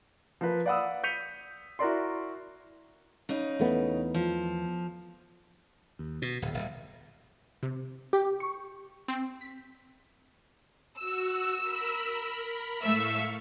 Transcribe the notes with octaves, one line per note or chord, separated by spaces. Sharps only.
F3 A#4 B4
D5 F5 F#5 B5 D#6 E6
G6 B6 C#7 D#7 F7
E4 F#4 A#4 D5 C6
C#3 D#4
E2 A3 B3
F3
D#2
B2
D1
D#1
C3
G4
C#6
C4
B6
F#4 E6
A#4 B5
A2 A3 E5 F5 C#6 E6